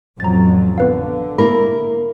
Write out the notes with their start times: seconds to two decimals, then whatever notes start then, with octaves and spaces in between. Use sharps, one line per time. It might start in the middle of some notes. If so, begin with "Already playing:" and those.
0.20 A1 F2 F#3 A#5 A6
0.78 D3 B3 B4 F5
1.38 A#3 E4 A#4 B5